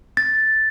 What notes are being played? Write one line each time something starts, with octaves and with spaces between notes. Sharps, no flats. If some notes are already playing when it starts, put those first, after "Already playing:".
A6